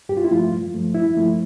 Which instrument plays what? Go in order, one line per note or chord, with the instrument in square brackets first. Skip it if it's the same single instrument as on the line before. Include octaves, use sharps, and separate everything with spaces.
[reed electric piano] G2 G4
F4
E4
F3 A3 F4
G2
F3 A3
G2 E4
F3 A3